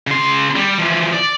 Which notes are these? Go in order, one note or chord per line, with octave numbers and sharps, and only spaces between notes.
C#3 C6
G3
E3 F3
D5